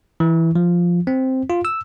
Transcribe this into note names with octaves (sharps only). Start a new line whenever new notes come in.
E3
F3
C4
F4
E6